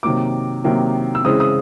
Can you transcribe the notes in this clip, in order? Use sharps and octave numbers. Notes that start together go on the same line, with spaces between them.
C3 D#3 F#3 A#3 D6
C3 D#3 F#3 A#3
E6
C#3 E3 G#3 C4 D#6
D#6